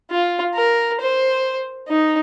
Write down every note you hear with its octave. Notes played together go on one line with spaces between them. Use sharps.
F4
A#4
C5
D#4